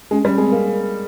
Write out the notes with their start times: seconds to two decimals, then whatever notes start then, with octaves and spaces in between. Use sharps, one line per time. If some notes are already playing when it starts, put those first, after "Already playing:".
0.11 G#3 C#4
0.25 G3 C#4
0.38 G#3 C4
0.52 A#3